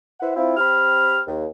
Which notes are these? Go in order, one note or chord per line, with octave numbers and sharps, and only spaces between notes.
E4 B4 C5 E5 F#5
C4 E4 F4
C4 G4 B5 F6
D#2